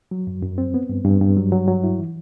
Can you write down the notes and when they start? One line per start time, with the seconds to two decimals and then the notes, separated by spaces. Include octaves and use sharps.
0.11 F#3
0.27 F#2
0.42 F#2
0.58 C4
0.74 B3
0.89 G2
1.05 G2
1.21 G2
1.37 F#3
1.52 F#3
1.68 F#3
1.84 E4
1.99 E3